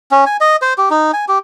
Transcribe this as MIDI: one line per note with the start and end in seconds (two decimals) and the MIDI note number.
0.11 0.25 61
0.26 0.37 80
0.41 0.56 75
0.62 0.74 72
0.78 0.89 67
0.90 1.11 63
1.13 1.25 80
1.28 1.38 67